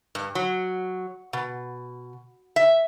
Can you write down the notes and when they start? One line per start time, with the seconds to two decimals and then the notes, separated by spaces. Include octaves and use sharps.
0.15 G2
0.35 F#3
1.33 B2
2.56 E5